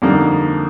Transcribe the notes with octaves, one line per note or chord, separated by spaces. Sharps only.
F2 D3 G3 A#3 D#4